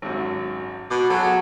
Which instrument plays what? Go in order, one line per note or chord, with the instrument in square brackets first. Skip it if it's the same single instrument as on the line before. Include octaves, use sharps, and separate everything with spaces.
[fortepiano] G#1 F#2
[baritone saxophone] B2 [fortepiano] D6
[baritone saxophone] F#3 [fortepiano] G#4 A4